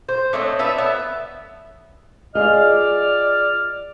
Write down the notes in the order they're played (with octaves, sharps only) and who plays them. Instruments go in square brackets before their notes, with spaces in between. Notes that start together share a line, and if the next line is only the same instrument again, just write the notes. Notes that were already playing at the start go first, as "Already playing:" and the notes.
[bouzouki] C5
[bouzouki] A3 C4 [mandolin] D4 C#5 D#5
[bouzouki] D4 F4 B4 [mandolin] E5
[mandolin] B3 [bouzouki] E5
[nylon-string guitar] F4 G#4 D#5 [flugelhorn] D5 [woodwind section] F6